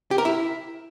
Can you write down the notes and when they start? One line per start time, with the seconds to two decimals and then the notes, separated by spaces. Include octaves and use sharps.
0.11 G4
0.18 A#4
0.25 E4